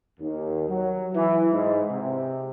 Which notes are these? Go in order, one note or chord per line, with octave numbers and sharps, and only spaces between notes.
D#2
F#3
E3
G#2
C3